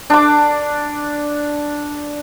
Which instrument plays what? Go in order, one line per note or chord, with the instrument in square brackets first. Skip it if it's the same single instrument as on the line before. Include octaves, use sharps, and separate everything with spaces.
[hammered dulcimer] D4 D6